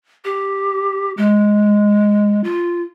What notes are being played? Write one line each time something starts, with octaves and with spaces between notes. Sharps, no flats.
G4
G#3
F4